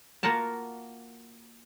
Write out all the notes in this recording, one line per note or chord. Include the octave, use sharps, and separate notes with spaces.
A#3 F4 F#4 A#4 A5